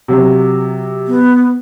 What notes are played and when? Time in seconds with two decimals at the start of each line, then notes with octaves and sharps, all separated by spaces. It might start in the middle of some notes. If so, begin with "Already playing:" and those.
0.08 C3 F#3
1.07 B3